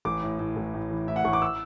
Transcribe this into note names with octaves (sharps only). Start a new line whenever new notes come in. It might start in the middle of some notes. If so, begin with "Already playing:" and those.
A1 D6
A2
A2
A1
A2
E3
A2 E5
F#5
A1 C#6
D6
E6